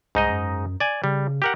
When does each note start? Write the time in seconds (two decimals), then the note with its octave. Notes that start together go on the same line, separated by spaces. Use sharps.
0.15 C2 G#2 D#4 D#5
0.29 F#2
0.80 D5 G#5
1.04 C#3 G3
1.42 G4 A#4 F#5